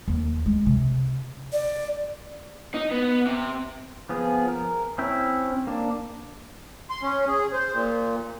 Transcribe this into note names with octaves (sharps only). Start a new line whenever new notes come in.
D#2
G#3
C3
D5
D#4
B3
C3
F3 B3 G#4
A#4
C4 C#4 E4 E5 G5
A#3 D4
C6
C#4
G#4
C5
A#2